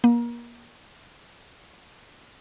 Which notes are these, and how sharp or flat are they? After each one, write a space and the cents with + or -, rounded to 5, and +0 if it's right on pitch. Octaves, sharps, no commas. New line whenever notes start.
A#3 +30